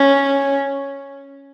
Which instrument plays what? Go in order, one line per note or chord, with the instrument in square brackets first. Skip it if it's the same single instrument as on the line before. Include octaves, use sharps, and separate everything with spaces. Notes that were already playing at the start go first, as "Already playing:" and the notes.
Already playing: [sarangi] C#4